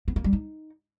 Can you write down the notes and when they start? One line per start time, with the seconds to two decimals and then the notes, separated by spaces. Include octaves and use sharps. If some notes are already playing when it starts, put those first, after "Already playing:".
0.08 B3
0.16 A#3
0.24 G3
0.33 D#4